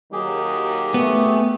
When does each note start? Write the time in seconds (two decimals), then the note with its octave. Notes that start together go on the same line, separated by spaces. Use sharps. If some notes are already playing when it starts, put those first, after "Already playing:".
0.13 D#2 D#3 F#3 G4 G#4
0.94 A3 B3